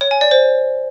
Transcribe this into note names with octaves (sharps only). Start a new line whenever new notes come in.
C#5
G#5
D5
C5